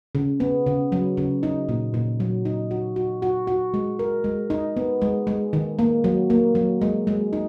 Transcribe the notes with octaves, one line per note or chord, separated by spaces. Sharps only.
C#3
B3
C#3
F#3
C#3
D#4
A#2
A#2
F#3
D#4
F#4
F#4
F#4
F#4
G#3
A#4
G#3
D#4
B3
G#3
G#3
D#3
A#3
F#3
A#3
F#3
G#3
G#3
D#4